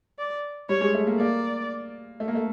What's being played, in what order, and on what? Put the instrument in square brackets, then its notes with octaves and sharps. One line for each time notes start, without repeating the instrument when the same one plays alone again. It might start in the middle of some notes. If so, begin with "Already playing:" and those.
[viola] D5
[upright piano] G3 [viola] C#5
[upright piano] G#3
A3
A#3
[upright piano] A#3 [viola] D5
[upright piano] A3
A#3
A3